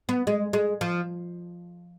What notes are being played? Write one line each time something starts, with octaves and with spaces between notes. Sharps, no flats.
B3
G#3
G#3
F3